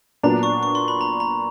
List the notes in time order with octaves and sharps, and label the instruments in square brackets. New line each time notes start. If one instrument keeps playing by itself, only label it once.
[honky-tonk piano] A#2 F#3 B3 D4 [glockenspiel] A#5
[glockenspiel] C#6
C#6
C6
B5
A#5
A#5